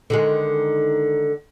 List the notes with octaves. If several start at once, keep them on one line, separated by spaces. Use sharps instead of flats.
D3 D#3 G#3